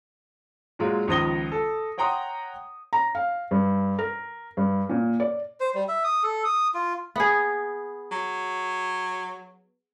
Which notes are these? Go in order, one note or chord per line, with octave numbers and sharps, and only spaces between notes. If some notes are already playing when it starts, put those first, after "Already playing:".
A#2 F#3 G#3 F4
C#2 D#3 F3 D#6 A#6 G7
A4
C#5 F#5 G5 A#5 C6 D#6
A#5
F5
G2
A#4
G2
A#2
D5
C5
G3
E5
D#6
A4
D#6
F4
B3 G#4
F#3